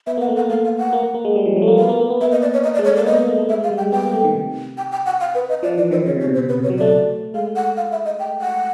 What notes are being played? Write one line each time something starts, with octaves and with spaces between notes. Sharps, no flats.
B3 E5
A#3 F#5
A3
F#5
A#3
A3 F5
F5
F#5
A#3
A#3
A#3
G#3
G3
F3
F#3
A3
A#3
B3 F5
A#3
A#3
B3
A#3 E5
D#5
D5
C#5
D#5
D5
G#3
C#5
A3
A#3 D5
B3 D#5
A#3
A3
A3
G#3 E5
G#3 F5
G3
G5
G#3
B3 G5
A#3
A3
D#3
C3
G5
G5
F#5
F5
B4
D#5
F3 D5
E3 D5
D#3 C5
C#3 C#5
C3 C#5
B2
C5
C3
B4
C3 C#5
F#3
A3 D5
G#3 F5
F#5
F5
E5
D#5
G5
F#5